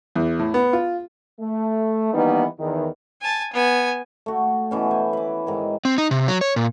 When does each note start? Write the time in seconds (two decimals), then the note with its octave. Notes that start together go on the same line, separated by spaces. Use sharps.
0.16 E2
0.39 A2
0.54 B3
0.73 F4
1.40 A3
2.13 D#3 E3 G3 A#3 B3 D#4
2.59 E2 D#3
3.21 G#5 A5
3.53 B3 G#5
4.26 A3 F#4
4.71 B2 E3 C#4
4.91 C5 G#5
5.13 B4 D6
5.46 G#2 D#3 G#5
5.85 C4
5.98 D#4
6.11 C3
6.28 F#3
6.41 C#5
6.56 A#2